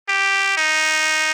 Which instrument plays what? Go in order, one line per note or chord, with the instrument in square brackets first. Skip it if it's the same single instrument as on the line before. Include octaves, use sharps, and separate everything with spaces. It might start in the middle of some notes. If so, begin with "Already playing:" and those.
[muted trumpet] G4
D#4